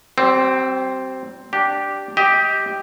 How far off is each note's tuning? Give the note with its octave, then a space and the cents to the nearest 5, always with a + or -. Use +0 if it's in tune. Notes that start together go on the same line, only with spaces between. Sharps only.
G3 -45 C4 +0
D4 +0 G4 -5
G4 +0 D#5 +25